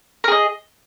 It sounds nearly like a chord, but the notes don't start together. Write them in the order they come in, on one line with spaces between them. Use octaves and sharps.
A#4 G#4 D#5